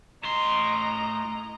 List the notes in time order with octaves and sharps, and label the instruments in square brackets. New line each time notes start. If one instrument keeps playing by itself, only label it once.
[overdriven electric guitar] A2 C6 [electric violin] D#5 A#5